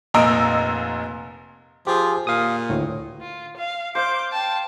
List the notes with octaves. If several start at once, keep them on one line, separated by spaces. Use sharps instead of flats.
F1 A#2 D#5 A#5 E6 D7
F3 G4 G#4
A#2 F5 D#6
D2 A2
F4
F5
C5 F5 D6 G6
G5 A5